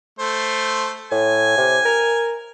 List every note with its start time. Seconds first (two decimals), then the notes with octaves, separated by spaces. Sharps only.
0.19 A3 C5
1.11 A2 G#5
1.57 C3
1.85 A#4